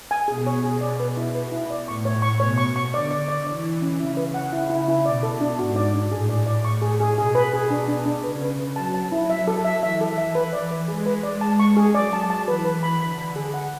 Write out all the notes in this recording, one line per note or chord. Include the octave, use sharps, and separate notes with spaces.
G#5
B2 G#4
C#5
G#4
D5
B4
E4
B4
E4
D5
A2 C#6
C#5
C#6
B2 C#5
C#6
C#6
D3 D5
D5
D5
E3 D5
D5
C#4
C#3 E4
B4
F#5
E4
E4
E4
B2 D5
A4
D4
G#2 F#4
D5
D4
A2 G#4
D5
D5
C#6
G#4
G#4
B2 G#4
B4
G#4
D4
D4
D4
C#3 B4
B4
B4
F#3 A5
A5
E4
E5
A4
E5
E3 E5
A4
E5
B4
D5
B4
G#3 G#4
B4
D5
A5
C#6
G#4
F#3 D5
A5
A5
E3 B4
B4
B5
D3 B5
B5
G#4
F#5